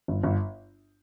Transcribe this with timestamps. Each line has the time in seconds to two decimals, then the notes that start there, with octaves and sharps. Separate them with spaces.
0.08 G1
0.23 G1